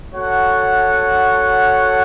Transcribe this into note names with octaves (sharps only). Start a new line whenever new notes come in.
F#4 A4 C#5 F#5